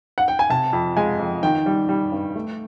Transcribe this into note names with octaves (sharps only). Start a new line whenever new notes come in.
F#5
G5
G#5
C3 A5
F2
G#3 G#5
F2
D#3 G5
G3
G3
G2
A3